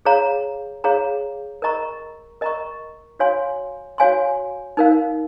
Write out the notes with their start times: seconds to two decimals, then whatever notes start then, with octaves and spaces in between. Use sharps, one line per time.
0.05 G#4 C#5 F5 A#5
0.84 G#4 C#5 F5 A#5
1.62 A#4 D#5 A#5 C#6
2.41 A#4 D#5 A#5 C#6
3.19 F#4 C#5 F5 G#5 C6
3.98 F#4 C#5 F5 G#5 C6
4.77 D#4 A#4 F5